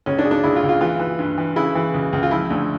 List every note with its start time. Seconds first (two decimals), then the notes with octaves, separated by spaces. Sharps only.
0.06 C#2 C#4
0.19 D4
0.25 C#3
0.31 D4
0.44 C#2 E4
0.56 F4
0.63 C#2
0.69 F4
0.81 E3 F4
0.99 E3
1.19 G2
1.38 E3
1.56 C#3 E4
1.75 E3
1.94 C#2
2.13 C#2
2.23 F4
2.31 F3 E4
2.50 D2